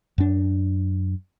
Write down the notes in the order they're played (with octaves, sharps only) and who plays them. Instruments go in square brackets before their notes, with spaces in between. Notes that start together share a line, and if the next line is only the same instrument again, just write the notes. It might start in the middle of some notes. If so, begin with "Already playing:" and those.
[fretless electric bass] F#2 D4